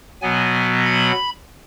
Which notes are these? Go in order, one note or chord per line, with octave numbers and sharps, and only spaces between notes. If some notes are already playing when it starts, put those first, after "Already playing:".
B2 F#3 B3 G#5
B5